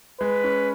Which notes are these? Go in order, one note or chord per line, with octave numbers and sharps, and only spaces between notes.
G#3 B4
C#4